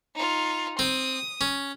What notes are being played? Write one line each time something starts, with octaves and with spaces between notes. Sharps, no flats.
D#4 F4
C4 D#6
C#4